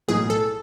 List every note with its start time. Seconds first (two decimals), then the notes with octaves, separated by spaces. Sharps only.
0.08 B1 A2 E3 G#4
0.30 A4